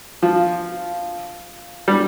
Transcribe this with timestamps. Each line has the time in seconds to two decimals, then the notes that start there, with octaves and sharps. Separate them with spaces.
0.22 F3
1.88 G3